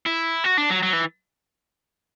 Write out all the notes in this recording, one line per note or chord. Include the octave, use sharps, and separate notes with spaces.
E4
F#4
D4
F#3
F#3
E3